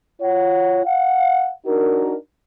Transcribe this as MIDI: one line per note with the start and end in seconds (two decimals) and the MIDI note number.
0.21 0.80 65
0.21 0.80 73
0.21 0.80 78
0.85 1.48 77
0.85 1.48 78
1.66 2.14 62
1.66 2.14 63
1.66 2.14 66
1.66 2.14 70